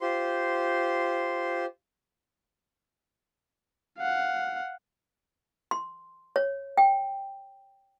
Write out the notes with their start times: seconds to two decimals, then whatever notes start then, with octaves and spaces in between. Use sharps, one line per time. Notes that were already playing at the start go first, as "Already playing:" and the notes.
0.01 F4 G4 C5 C6
3.99 F5 F#5
5.71 C6
6.36 C#5
6.78 G5